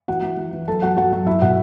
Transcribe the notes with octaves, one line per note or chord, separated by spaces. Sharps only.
E3 F#4 F#5
E3
E3
E3
F#3 A4 A5
F#3 F#4 F#5
F#3 F#4 F#5
F#3
F#3 E4 E5
B2 F#4 F#5